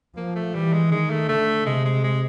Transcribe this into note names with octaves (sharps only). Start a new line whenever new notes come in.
F3 A#3
A3
E3 G3
G#3
D#3 G#3
A3
D3 A3
C3 G#3
G#3
G#3